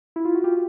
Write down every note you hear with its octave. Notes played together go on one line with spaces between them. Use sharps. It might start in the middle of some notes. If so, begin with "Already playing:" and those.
E4
F4
F#4
F4 G4